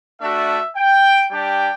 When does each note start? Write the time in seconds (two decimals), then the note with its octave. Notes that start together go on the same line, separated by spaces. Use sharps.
0.20 A3 D4 F#4 E5
0.76 G5
1.31 G3 D4 G4 G5